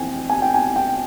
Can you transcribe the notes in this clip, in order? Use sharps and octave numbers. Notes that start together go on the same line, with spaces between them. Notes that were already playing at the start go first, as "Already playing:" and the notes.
Already playing: F2 E3 G5 G#5
G#5
G5
G#5
G5